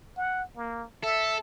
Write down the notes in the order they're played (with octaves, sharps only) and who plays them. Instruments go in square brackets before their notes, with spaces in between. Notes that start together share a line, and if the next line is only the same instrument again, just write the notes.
[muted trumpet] F#5
A#3
[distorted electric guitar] A4 [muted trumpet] E5